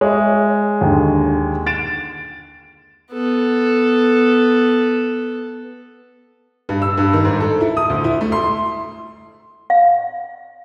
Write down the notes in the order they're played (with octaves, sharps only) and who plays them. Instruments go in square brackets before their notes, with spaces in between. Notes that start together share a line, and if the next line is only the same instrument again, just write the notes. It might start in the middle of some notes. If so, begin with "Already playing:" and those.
[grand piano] G#3 [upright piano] C#5 E5
[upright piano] D#2 D3
A6 D7 E7
[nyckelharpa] B3 A4
[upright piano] G2
E6
G2
D#3
G#2
A4
E4
D#6
D2
E4
A3
C6
[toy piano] F5